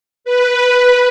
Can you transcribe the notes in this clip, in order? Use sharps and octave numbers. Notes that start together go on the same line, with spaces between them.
B4